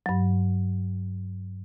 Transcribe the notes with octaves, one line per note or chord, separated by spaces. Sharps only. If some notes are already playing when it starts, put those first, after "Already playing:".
G2 F#3